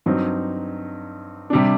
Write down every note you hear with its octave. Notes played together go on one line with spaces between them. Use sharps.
G2 F#3 C4 D#4
C3 G3 D4